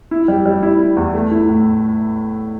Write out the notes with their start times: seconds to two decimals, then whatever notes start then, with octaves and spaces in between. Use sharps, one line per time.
0.11 E4
0.28 G3
0.46 G3
0.63 E4
0.80 E4
0.97 E2
1.14 A3
1.31 E4
1.49 A2